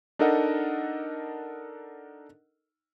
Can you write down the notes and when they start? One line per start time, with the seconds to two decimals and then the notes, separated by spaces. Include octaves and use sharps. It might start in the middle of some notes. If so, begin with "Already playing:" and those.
0.19 D4 D#4 A4 A#4 D#5 F#5